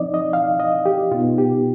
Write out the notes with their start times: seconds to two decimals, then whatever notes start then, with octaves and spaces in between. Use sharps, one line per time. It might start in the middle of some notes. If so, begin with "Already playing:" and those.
Already playing: F3 C4 D#4 D5 D#5
0.14 D#5
0.33 F5
0.60 D#5
0.86 G4
1.12 B2 F4
1.15 B3 D#4
1.38 G4